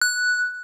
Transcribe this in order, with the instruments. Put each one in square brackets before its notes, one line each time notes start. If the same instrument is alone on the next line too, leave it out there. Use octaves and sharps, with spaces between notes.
[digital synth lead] F#6